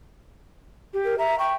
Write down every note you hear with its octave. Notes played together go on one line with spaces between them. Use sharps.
G4
A#4
E5 A#5
G5 C#6